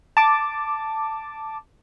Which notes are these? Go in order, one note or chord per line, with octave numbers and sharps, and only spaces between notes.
A5 D6